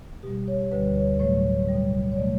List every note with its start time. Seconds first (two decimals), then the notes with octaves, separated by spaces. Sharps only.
0.23 B2 G3 G4
0.48 C#5
0.72 D2 D3 G3 B4
0.96 C#5
1.19 A2 F#3 A3 C#5
1.68 B2 G3
2.12 C#5
2.17 B2 F#3 A3 D5